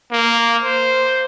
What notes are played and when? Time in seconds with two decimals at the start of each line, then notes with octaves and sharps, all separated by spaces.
0.12 A#3
0.63 C5